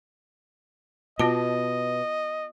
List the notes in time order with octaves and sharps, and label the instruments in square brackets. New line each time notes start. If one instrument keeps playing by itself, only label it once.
[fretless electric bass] B2 [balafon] B3 F4 A5 [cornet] D#5